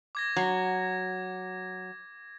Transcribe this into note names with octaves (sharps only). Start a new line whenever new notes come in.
D6 G#6 A#6
F#3